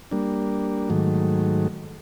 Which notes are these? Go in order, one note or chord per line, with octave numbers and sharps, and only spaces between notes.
G3 A#3 D4
G#2 D#3 F#3 A3